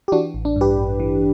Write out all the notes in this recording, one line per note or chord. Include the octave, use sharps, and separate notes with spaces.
G4
E3 D4 F#4
A1
D4
G2
G4 B4
A1
E3